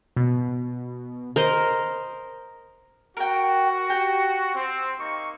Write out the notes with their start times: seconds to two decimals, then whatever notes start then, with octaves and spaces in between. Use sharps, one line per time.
0.17 B2
1.36 A#4 C5 D#5
3.17 F#4 A#4 G5
3.90 G4
4.55 C4
4.99 A#3 D#4 C#6